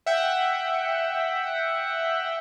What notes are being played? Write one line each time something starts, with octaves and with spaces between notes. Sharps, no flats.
E5 F#5 G5